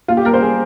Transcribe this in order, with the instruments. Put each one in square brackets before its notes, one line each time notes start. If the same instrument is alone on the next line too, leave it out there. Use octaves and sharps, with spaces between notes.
[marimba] A#3 [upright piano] F4
[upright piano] G4
[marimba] A#3 [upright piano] A#4
[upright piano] C5
G#4